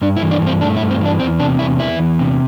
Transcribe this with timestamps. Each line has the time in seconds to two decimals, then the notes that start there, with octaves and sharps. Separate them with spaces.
0.02 G2 D4
0.16 E4
0.22 E3
0.31 D4
0.41 G2
0.47 C4
0.61 A3 D4
0.76 E4
0.81 G2
0.91 C4
1.01 E3 D4
1.20 E2 C4
1.39 C3 D4
1.59 E2 E4
1.79 E3 E4
1.99 E2
2.19 C3